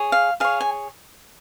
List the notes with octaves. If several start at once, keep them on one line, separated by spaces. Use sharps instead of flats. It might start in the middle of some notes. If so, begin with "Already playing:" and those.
Already playing: G#4 C#5
F5
G#4 C#5 F5
G#5